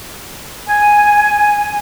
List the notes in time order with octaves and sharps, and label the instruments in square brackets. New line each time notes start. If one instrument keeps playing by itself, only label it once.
[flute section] G#5